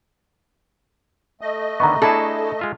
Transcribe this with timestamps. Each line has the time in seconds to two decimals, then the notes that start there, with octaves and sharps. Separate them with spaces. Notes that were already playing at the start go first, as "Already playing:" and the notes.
1.41 A3 D#5
1.80 D3 D#3 B3 A#5 C#6
2.02 D4 E4 G#4 A4
2.59 G#3 F4 E5